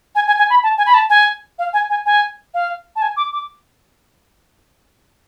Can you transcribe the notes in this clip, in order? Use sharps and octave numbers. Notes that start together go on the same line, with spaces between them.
G#5
G#5
G#5
B5
A5
G#5
B5
A5
G#5
F5
G#5
G#5
G#5
F5
A5
G#5
D6
D6